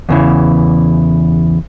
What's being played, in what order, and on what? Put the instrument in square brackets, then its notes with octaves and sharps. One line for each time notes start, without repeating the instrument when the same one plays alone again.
[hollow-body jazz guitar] E2 C#3 E3